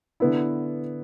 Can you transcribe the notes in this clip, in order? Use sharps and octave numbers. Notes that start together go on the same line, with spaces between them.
D3 B3 E4